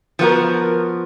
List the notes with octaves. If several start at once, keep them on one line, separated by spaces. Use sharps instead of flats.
F3 B3 F#4 A#4